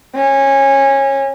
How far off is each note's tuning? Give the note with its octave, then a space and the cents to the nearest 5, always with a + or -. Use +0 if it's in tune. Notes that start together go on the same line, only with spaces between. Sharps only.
C#4 -20